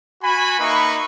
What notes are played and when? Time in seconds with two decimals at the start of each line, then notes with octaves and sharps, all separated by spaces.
0.23 F#4 G#5 B5
0.59 A#3 D#4 B4 E5 B5 C#6